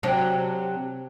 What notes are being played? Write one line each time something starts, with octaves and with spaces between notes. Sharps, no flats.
C3 F#3 D4